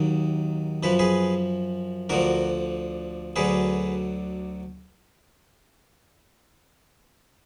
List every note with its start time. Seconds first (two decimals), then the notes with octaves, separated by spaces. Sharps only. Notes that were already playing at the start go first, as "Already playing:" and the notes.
Already playing: D#2 D#3 F#3
0.83 F#2 F3 B4
0.99 G#4 B4
2.10 D2 D3 F3 F#4 A#4
3.36 D2 D3 F#3 G#4 B4